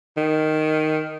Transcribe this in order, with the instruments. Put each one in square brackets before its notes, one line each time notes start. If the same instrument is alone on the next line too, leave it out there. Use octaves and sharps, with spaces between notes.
[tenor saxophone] D#3